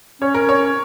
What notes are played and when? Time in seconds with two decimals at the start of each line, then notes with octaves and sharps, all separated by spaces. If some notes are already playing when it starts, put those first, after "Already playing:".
0.21 C#4 C#5
0.34 A#4
0.49 C#5